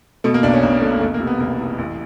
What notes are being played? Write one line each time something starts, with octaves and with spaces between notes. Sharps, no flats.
B2 A3
A#3
B1 D4
C#4
B1
A#3
B2 A3
A#3
E1 A3
A#3
C3
B3
E1 A#3
E2
A1